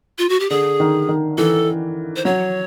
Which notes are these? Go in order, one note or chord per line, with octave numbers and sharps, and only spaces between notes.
F4
F#4
G4
D3 G#4
D#3
D#3
E3 A4
C5
F#3 C#5